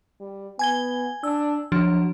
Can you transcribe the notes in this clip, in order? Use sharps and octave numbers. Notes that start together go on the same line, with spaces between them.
G3
B3 G#5 G#6 G7
D4 E6
F3 F#3 D4